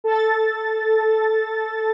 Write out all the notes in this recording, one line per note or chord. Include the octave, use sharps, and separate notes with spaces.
A4 A6